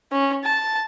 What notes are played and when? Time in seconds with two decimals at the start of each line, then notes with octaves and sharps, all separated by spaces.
0.12 C#4
0.44 A5